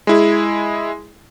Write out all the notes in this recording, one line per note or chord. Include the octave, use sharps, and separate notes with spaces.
G#3 E4 G#4